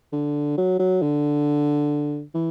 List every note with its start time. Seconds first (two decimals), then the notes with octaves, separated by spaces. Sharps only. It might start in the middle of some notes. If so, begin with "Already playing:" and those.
0.13 D3
0.58 F#3
0.79 F#3
1.02 D3
2.35 E3